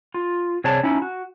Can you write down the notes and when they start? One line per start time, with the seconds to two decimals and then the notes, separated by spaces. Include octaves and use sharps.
0.14 F4
0.64 C3 G#4 C#5 D5 A5
0.83 C#4 D#4 E4
1.02 F#4